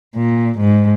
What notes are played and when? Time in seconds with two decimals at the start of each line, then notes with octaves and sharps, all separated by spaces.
0.16 A#2
0.59 G#2